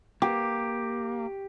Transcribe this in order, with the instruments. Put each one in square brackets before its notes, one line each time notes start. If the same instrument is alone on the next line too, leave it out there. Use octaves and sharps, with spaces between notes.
[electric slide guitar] A#3 [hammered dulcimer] G4